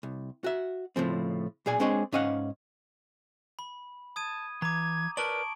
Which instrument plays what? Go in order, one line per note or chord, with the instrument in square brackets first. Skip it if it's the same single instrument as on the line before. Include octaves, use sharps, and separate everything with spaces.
[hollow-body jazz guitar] C2
F#4 E5
A2 C#3 F3 C4
B1 A#2 G#4 D5 G#5
G#3 C4 D4 G#4 C#5 D#5
G#2 C#4 D#5 F5 F#5
[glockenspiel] B5
[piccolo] A5 [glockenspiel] D#6 G#6 D#7
[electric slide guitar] E3 [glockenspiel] A#5 D6 [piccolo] G#6
[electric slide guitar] A#4 B4 D5 [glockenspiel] A5 C#6 F#7 [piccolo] D7